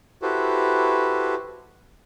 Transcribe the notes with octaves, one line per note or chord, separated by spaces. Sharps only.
E4 F#4 G4 A4 B4 C5